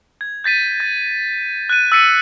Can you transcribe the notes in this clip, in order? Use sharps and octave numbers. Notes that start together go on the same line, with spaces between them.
G#6
G6 A6 B6 D#7
A6
F#6 D#7
E6 A6 B6 C#7 D#7